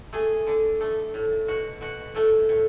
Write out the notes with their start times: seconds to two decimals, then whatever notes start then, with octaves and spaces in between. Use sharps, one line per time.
0.13 A3 G#4
0.47 D3
0.81 A3
1.14 A2
1.48 B2 F#4
1.81 B2 F#4
2.15 A2 A3
2.49 A2